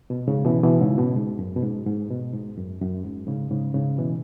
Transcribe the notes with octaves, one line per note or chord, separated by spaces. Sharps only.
B2
G#2 C#3
B2 E3
B2 E3
G#2 C#3
B2
G#2
F#2
B2
G#2
G#2
B2
G#2
F#2
F#2
G#2
G#2 C#3
G#2 C#3
G#2 C#3
B2 E3